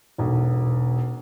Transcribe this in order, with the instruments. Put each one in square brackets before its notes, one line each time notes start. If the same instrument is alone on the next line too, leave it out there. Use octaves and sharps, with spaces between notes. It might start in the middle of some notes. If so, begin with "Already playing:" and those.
[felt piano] E1 B1